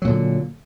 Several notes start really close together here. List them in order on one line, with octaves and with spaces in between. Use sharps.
F#3 A#2 D3